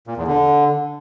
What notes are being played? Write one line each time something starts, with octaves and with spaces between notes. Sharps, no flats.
A#2
E2
D3